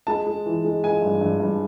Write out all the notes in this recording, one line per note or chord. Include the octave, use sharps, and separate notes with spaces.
G#3 A5
G#3
E3
G#3
G#3 G#5
G2
G2
G2